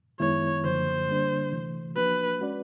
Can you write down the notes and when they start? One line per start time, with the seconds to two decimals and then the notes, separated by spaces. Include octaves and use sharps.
0.20 F#2 D#3 G#3 B3 E4 C#5
0.64 F#2 D3 F3 A#3 C5
1.08 D3 G3 A#3 D4
1.52 C3 E3 A3
1.95 F3 A#3 D4 F#4 B4
2.39 G#3 C#4 F#4 B4 D5